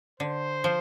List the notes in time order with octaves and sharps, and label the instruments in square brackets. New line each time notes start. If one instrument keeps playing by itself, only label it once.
[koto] D3 [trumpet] C5
[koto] F3